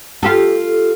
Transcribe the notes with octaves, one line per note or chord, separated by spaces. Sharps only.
F4 G4 A4